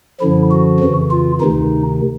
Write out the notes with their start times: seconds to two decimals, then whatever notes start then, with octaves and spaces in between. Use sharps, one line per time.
0.20 F#2 D3 F3 E4
0.51 F#4
0.80 F2 C#3 E3
1.10 F4
1.41 D2 C3 D#3 D#4